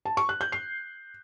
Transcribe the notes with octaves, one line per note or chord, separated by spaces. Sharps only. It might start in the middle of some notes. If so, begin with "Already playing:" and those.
A5
C#6
F#6
G6
C7